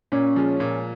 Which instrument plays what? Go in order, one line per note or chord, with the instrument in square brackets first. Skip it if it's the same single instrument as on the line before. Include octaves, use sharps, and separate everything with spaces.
[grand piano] A#2 [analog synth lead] C#4
[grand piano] F3 G#3
A#2